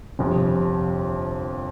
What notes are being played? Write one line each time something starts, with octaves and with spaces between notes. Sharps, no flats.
G1 F2 C3